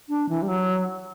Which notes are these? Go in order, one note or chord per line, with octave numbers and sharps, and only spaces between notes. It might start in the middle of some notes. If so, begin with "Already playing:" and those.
D4
E3
G3
F#3